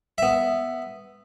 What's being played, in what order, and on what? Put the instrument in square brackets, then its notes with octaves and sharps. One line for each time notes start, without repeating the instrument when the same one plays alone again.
[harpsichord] B3 E5